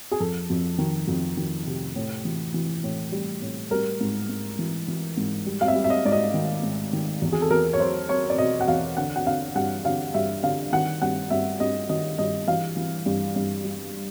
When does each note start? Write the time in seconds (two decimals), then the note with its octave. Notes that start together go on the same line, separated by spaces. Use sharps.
0.12 G#4
0.20 F2 A4
0.50 F2
0.78 D#3
1.08 F2
1.37 D#3
1.66 C3
1.96 A2
2.25 E3
2.54 E3
2.84 A2
3.12 G3
3.42 A2
3.71 G3 A#4
4.01 G#2
4.29 G#2
4.59 E3
4.88 E3
5.17 G#2
5.46 G3
5.61 F5
5.68 E5
5.75 G3
5.84 E5
5.90 D#5
6.05 G#2 D5
6.12 D#5
6.34 D#3
6.63 G#2
6.93 D#3
7.22 E2
7.32 G#4
7.42 A4
7.51 E2 A#4
7.73 C#5
7.80 F#3 C5
8.09 F#3 C#5
8.30 D5
8.38 B2 D#5
8.61 F#5
8.68 E2 F5
8.97 D3 F#5
9.16 F#5
9.26 D3 F5
9.55 G2 F#5
9.85 D3 F5
10.14 G2 E5
10.43 D3 F5
10.72 D#3 F#5
11.02 G2 F#5
11.30 G2 E5
11.60 G2 D#5
11.89 D#3 D#5
12.18 G2 D#5
12.48 E3 F5
12.77 E3
13.06 G2
13.36 G2
13.65 G3